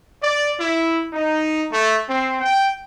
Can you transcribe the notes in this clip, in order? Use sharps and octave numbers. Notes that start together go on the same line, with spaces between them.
D5
E4
D#4
A3
C4
G5